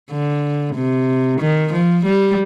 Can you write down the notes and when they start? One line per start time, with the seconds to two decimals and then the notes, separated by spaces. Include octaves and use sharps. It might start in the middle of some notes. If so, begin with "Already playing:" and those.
0.11 D3
0.75 C3
1.40 D#3
1.73 F3
2.05 G3